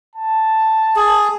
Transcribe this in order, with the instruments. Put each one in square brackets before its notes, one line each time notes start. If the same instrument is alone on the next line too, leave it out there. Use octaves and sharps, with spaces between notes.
[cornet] A5
[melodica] G#4